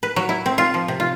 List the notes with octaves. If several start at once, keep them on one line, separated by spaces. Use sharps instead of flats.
B4
F#3
E4
C4
F4
F3
C3
F4